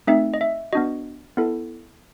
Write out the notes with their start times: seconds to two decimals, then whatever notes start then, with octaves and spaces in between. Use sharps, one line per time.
0.07 A3 C4 D#4 E5
0.34 D#5
0.41 E5
0.73 B3 D4 F#4 D#5
1.37 B3 E4 A4